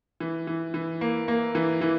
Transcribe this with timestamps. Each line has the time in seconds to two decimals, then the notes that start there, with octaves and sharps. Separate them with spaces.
0.20 E3
0.47 E3
0.74 E3
1.01 A#3
1.28 A#3
1.55 E3
1.81 E3